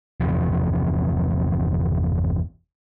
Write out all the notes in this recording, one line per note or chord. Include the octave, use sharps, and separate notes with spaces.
G1 E2 C3 F3